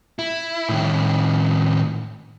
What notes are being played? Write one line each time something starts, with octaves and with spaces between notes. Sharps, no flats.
E4
A2 D#3